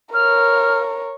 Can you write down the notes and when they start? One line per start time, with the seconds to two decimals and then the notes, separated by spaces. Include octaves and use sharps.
0.14 A#4 C#5 F6